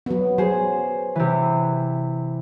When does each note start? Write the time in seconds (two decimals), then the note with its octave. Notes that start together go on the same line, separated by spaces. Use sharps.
0.06 F#3 B3
0.38 F#3 G#4 C5
1.16 C3 E3